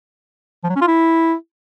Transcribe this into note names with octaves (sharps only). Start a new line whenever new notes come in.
F3
F#3
C#4
F4
E4